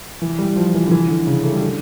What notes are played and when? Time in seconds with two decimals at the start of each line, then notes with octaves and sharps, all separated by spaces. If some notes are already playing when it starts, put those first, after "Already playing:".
0.22 E3
0.39 G3
0.56 F3
0.67 F3
0.74 E3
0.87 D3
0.91 E3
1.08 D3
1.27 C#3
1.44 A3
1.52 G3
1.61 D3